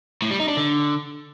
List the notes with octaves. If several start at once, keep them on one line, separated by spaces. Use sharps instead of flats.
A2
G3
D#4
D4
D3